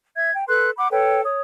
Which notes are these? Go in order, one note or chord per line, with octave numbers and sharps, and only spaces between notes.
E5 G#6
G5
A4 B4 C6 F#6
F#5 B5 D6
A4 B4 C#5 G5
C#5 D#6